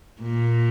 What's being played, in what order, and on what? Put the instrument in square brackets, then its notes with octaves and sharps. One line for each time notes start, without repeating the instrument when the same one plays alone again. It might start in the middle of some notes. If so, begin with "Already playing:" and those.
[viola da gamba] A#2